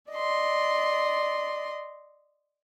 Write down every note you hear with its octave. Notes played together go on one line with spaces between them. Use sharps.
D5 D#5 C6